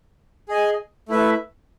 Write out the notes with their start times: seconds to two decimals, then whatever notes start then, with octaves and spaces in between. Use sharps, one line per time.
0.49 G#4 D#5 G#5
1.08 A3 E4 B4 E5